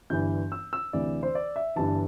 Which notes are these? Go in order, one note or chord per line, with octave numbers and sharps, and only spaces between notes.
G1 G2 E3 G6
E6
E6
D2 C3 E3 D5
C5
D5
E5
G1 G2 E3 A5